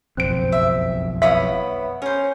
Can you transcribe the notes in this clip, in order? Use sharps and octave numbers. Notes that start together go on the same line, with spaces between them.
F#1 B1 F2 C4 F#6 D7
E5
B3 E4 C#5 E5 F5 D#6
C#4 A#4 C5